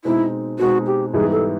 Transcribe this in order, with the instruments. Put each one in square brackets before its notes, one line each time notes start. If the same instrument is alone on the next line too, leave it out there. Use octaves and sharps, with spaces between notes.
[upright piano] B2 G#3 C4 D#4 [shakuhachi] E4
[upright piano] B2 G#3 C4 D#4 [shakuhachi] F#4
[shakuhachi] G4
[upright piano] G#2 E3 G3 B3 D#4 [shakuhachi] G#4
[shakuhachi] A4